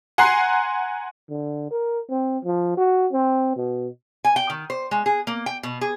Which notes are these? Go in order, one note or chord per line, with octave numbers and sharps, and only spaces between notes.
F#5 G#5 A#5 C6 F#6 C7
D3
A#4
C4
F3
F#4
C4
B2
G#5
G5
D#3
C5
G#3
G#4
A#3
G5
B2
G#4